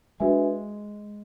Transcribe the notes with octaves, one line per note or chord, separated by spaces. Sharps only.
G#3 D4 F#4 B4 E5 G#5